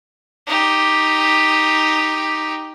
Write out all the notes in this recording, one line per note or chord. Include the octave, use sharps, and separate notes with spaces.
D#4 G4